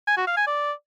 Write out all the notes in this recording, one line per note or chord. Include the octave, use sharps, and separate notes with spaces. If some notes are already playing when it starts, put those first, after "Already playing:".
G#5
F#4
F5
G#5
D5